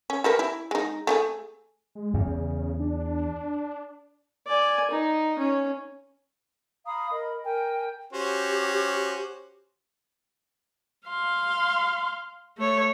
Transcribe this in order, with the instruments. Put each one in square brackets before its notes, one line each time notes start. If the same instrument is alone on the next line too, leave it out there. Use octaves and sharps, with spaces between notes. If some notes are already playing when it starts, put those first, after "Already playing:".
[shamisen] C#4
G3 A#4 B4
E4
G#3 D#4
A3 G4 G#4
[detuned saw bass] G#3
[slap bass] E2 [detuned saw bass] C#3
[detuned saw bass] D4
[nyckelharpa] D5 G#5
D#4
C#4
[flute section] F5 A#5 B5 D#6
A#4 D#5 B5
A#4 G5 G#5
[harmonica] C#4 F#4 C5 [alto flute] G4
[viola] F5 C6
A3 C#5